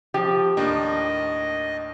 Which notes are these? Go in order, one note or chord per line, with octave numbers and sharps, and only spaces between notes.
F3 G4
D#2 A2 A#3 D4 D#5